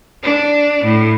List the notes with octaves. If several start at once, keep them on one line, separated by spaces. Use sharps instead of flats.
D4
A2